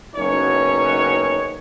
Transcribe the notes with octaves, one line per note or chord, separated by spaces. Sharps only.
F#1 B2 C#4 D#4 C#5